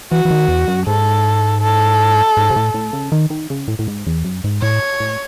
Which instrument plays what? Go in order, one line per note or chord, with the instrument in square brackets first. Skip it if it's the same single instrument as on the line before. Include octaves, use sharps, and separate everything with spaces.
[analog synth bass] E3 [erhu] F#4
[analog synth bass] E3
D#3
E2
F#2
[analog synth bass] G#2 [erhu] A4
[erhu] A4
[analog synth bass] G#2
C3
A2
A2
C#3
D#3
D#3
C#3
A2
A2
G#2
E2
F#2
G#2
[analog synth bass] A2 [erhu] C#5
[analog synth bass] A2